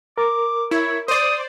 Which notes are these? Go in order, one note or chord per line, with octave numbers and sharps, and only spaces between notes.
A#4 D6
E4 C#5
C5 D5 D#6